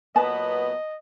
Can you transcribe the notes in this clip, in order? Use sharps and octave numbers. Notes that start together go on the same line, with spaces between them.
A#2 F#3 B3 D#5 A5